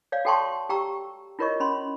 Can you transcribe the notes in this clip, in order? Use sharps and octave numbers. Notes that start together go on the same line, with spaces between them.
C#5 D5 F5
F#4 A4 G5 A5 C6 C#6
G4 G5 A#5 C#6 E6
E4 F4 A#4 C#5 D#5 C#6
C#4 B5 C6